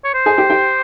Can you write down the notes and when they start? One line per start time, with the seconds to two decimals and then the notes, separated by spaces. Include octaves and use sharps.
0.04 C#5
0.14 C5
0.26 G#4 G#5
0.38 G4 G5
0.50 G4 G5